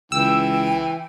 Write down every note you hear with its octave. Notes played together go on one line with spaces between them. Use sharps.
C#2 E3 G5 E6